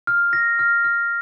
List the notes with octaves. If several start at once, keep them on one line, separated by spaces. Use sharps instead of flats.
F6
A#6
F6
F6